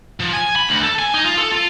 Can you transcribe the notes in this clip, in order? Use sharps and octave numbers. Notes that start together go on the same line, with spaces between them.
F3
G#5
B5
D2
A4
G#5
D#4
F4
A4
F4